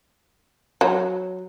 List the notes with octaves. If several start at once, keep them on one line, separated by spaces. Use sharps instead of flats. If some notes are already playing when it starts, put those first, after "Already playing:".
F#3